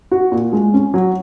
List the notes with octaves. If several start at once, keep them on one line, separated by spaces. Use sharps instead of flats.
F#4
A#2
G#3
C#4
F#3